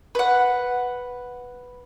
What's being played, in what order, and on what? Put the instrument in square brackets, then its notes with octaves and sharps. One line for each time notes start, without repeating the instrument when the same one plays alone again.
[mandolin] B4 F#5